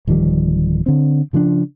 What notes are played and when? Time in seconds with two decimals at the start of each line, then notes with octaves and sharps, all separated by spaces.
0.07 D1 D#3 F3 G3
0.86 D3 C4
1.33 C#3 F3 A#3 D4